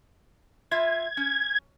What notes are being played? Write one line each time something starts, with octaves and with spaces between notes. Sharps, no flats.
F4 E5 G#6
C#4